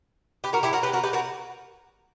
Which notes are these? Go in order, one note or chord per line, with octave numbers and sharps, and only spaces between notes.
G4 B4
F#4 A#4
E4 G4
F#4 A#4
G4 B4
F#4 A#4
G4 B4
F#4 A#4